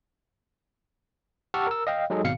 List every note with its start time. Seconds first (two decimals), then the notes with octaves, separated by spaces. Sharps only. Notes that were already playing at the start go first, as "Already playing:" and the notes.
1.54 G4 F#5 A5 C#6 E6 F6
1.67 A#4 E6
1.87 D#5 F5 G5
2.10 F#3 G#3 D#4 G#4 A4 D#5
2.24 G#1 B2 F5 C#7